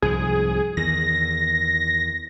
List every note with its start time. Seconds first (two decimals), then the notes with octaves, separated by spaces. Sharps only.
0.02 C2 G#2 F3 G#4
0.77 E2 D#3 A#6